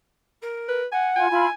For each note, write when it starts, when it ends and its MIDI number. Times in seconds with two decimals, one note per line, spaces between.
0.42 0.81 70
0.68 0.86 71
0.92 1.26 78
0.92 1.10 80
1.16 1.28 65
1.16 1.53 80
1.31 1.49 64
1.31 1.45 65
1.31 1.45 83